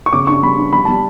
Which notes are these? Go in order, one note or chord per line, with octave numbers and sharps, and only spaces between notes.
C#6
C#3 D6
D4 C#6
G3 B5
D4
G3 B5
G3 A5